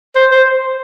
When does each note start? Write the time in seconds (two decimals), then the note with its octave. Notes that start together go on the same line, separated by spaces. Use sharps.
0.15 C5
0.32 C5